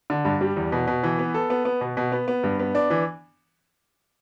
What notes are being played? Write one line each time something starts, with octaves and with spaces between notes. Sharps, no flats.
D3
G2
G3
E2
B2
B2
E3
B3
A4
B3
B3
B2
B2
B3
B3
G2
B3
D4
E3